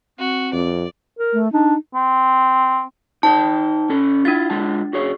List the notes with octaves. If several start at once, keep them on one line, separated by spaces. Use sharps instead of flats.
C4 F#4
F2 D5
A#4
A3
D4 D#4
C4
D#4 C5 G5 A5
C#4 A4
D4 E4 F4 A6
G#3 F4 A5
F#4 G#4 C#5